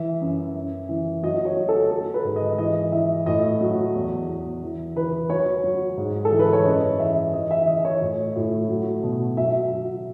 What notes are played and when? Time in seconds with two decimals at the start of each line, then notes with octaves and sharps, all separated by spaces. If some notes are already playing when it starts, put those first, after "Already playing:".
Already playing: E3 E5
0.21 F#2
0.55 F#2
0.89 E3
1.23 F#3 D#5
1.45 C#5
1.57 F#3
1.69 A4
1.91 F#3 A4
2.14 B4
2.24 G#2
2.36 D#5
2.58 E3 D#5
2.92 E3 E5
3.26 A2 D#5
3.61 F#3
3.94 E2
4.28 E2
4.63 E3
4.96 E3 B4
5.30 F#3 C#5
5.64 F#3
5.97 G#2
6.25 A4
6.32 E3
6.39 B4
6.53 C#5
6.66 F#2 D#5
6.99 E3 E5
7.34 E3 D#5
7.51 E5
7.67 E3 D#5
7.85 C#5
8.01 A2
8.36 A2
8.69 F#3
9.03 B2
9.37 F#3 E5
9.70 F#3